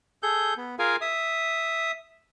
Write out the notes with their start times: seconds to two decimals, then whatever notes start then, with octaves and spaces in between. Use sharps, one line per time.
0.23 G#4 A4 G6
0.57 B3
0.79 F4 G#4 A#4 F5 G#5
1.01 E5 D#6